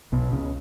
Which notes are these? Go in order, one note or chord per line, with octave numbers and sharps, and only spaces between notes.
B1 B2
C#2 C#3